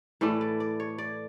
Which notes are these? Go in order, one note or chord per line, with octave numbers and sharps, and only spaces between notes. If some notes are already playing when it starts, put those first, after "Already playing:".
A2 E3 A3 D5
D5
D5
C#5
D5